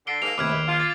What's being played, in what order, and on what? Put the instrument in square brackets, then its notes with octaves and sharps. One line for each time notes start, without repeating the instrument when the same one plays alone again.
[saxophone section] D3 [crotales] C7 D7 G7
[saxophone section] G#2 A#3 [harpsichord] A4 F5 [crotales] F7
[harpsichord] D#2 C3 A3 [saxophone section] E4 B4 [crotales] D6 F6 G#6
[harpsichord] A#1 D#2
[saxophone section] F4
[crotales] D6 A6